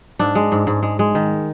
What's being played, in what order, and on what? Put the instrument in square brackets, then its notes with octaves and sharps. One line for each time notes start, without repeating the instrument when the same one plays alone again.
[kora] G#2 D4
G#3
G#2
G#2
G#3
G#3
D#3